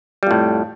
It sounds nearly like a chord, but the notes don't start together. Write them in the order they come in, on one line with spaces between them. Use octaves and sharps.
G3 F2 A2